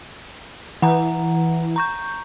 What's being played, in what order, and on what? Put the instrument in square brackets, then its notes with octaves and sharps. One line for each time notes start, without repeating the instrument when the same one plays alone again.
[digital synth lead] E3 [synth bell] F#5 A#5
[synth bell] A#5 C#6 G6